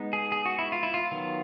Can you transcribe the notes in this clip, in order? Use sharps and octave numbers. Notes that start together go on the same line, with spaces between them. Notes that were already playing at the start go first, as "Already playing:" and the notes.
Already playing: G#3 B3 D#4
G#4
G#4
F#4
E4
F4
E4
F4
D#3 F#3 B3